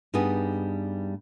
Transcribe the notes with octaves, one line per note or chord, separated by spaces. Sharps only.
G2 G3 B3 D#4 G#4